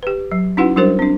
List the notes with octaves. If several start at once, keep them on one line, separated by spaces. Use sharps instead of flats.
G4 B4
F#3
C#4 D#4 E4 F#4 B4 F#5
F#3 G3 D4 F#4 A#4 C5
C4 D4